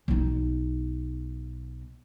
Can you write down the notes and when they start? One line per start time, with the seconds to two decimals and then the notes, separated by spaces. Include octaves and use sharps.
0.08 B1 D#4